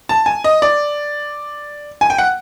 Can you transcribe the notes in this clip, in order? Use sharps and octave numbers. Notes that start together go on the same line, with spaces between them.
A5
G#5
D#5
D5
G#5
G5
F#5